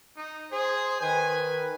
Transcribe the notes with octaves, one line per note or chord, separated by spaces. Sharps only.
D#4
G#4 C5
D#3 B4 G#5